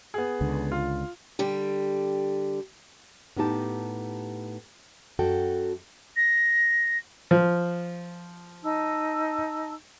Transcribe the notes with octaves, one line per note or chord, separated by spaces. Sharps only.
B3 G#4
C#2 D3
F4
D3 G3 G4
A2 B3 D#4 G4 A5
F#2 F#4 A4 G5
A#6
F3
D#4 A5 E6